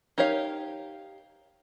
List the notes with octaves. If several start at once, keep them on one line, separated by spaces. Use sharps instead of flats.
D#4 G4 A#4 C#5 F5